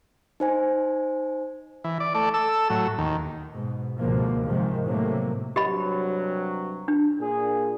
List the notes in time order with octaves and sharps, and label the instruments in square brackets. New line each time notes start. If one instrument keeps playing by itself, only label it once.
[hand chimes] D#4 C5 G#5
[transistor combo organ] E3
D5
A3 D5
A4 E6
A2 F#3
D#2
[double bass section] G#2 B2
C#2 G#2 B2 D3 F3 A#3
G#2 C3 D#3 F3 G#3
A2 C3 F#3 A3 A#3
[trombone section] G2 C3 F#3 [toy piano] G4 D#5 B5
[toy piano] D4
[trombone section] A#2 G#4